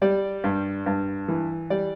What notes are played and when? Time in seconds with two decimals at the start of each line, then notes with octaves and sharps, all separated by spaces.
0.02 G3 D5
0.44 G2
0.86 G2
1.28 E3
1.70 G3 D5